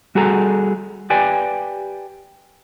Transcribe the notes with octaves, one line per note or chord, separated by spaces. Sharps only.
G3 F#4 G#4 A4 A#5
G4 B4 D5 G5 G#5